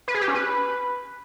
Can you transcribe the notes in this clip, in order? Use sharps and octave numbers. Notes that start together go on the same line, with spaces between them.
B4
G#4
G4
C#4
B4